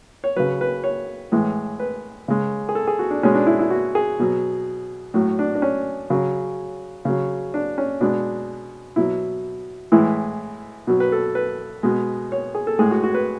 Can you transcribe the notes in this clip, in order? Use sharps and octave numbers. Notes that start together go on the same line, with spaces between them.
C#5
C#3 F#3 B4
B4
C#5
A2 E3 G#3
B4
C#3 G#3
G#4
A4
G#4
F#4
D4
B2 G#3 C#4
D4
E4
E4
F#4
G#4
B2 F#3
A2 F#3
D4
D4
C#4
C#3 F#3
C#3 F#3
D4
C#4
B2 G#3 D4
B2 F#3 E4
A2 E3 G#3 E4
B2 F#3
B4
A4
B4
B2 G#3
C#5
G#4
A4
A2 G#3 G#4
F#4
F#4
B4